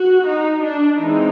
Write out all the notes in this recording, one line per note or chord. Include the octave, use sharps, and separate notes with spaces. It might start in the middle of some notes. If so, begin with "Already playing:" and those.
Already playing: F#4
D#4
D4
E3 G#3 C4 D#4